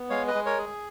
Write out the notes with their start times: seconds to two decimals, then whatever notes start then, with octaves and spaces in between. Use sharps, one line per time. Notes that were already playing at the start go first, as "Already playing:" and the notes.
Already playing: B3
0.10 G#3 C#5 F5
0.28 B4 D#5
0.35 G#3
0.46 A#4 C#5
0.58 G#4